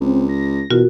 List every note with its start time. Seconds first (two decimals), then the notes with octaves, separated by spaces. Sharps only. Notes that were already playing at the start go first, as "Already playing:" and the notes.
0.01 C#2 C4
0.29 A#6
0.70 E2 B2 F4 F#4 A#4